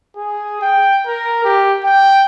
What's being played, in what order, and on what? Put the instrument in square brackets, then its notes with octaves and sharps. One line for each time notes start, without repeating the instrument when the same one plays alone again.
[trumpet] G#4
G5
A#4
G4
G5